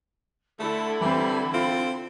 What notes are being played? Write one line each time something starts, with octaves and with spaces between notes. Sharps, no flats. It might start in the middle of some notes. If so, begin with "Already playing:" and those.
D3 A3 E4 A4 B5
E3 G3 C4
C4 F4